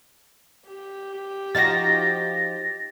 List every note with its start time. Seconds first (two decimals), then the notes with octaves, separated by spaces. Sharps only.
0.67 G4
1.55 F3 D#4 F#4 A6 A#6